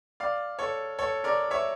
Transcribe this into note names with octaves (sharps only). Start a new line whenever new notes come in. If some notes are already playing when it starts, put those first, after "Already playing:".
D5 F5
A4 C#5
A4 C#5
A#4 D5
C#5 E5